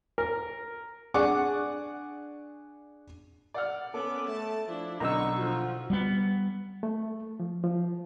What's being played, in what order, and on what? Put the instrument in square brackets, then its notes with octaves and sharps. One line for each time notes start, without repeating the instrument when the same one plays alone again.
[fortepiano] A#4
D4 G#4 F#5 C#6 D6
D5 F#5 F6
[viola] B3 D6 [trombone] C#4 [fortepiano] A4
[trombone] A3 [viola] A5
[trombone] F3 [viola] D4 E4
[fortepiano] B1 D3 [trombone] D#4 [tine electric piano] A#5 E6 [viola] C#6
[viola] F3 F4 [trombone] F#4
[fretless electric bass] G3 B3
[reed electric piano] A3
F3
F3